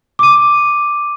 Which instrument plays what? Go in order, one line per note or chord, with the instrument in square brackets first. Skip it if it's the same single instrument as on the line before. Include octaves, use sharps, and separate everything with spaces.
[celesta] D6 D#7